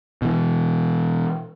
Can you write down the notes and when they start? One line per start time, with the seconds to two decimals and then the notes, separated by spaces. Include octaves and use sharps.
0.22 B2 E3